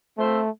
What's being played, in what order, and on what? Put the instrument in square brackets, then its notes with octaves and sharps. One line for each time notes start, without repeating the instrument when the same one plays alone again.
[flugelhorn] A3 [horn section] C4 F4 C5 E5